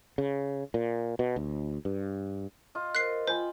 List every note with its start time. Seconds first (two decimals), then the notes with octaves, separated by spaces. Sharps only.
0.18 C#3
0.74 A#2
1.19 B2
1.36 D2
1.85 G2
2.75 F4 D#5
2.95 A#4 C5 F#6 C7
3.27 F4 C5 G5 G#5 B5